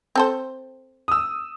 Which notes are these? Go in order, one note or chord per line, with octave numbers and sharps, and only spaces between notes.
C4 A4 C5
D#6 E6